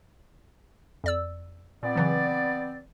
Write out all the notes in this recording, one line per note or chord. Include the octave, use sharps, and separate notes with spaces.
F2 D5 E6
A#2 B3 C4 D5
C#3 E3 F#3